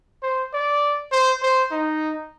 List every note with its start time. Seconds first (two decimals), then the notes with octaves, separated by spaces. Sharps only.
0.23 C5
0.54 D5
1.12 C5
1.42 C5
1.71 D#4